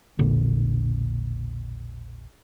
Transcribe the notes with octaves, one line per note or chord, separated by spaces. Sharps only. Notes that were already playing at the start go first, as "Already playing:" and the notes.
E1 A#1 A#2 D3